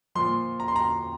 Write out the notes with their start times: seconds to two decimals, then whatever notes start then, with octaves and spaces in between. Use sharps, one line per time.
0.15 A#2 F3 C6
0.60 A#5
0.68 C6
0.76 A#5